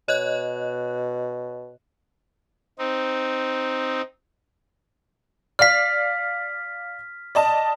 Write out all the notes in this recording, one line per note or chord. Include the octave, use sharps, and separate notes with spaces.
B2 C#5 D#5 F#6
C4 D#4
D5 F5 F6 B6
D5 D#5 A5